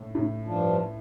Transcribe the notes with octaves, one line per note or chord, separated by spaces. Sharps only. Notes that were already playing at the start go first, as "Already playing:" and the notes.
Already playing: A2
A2
G2 F3 D4 F4